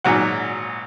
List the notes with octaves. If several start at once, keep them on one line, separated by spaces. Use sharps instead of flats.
G#1 A#2 F#3 F#5